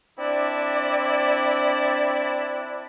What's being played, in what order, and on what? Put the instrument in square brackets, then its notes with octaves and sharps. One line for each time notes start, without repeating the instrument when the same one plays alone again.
[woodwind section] C4 D4 E4 D5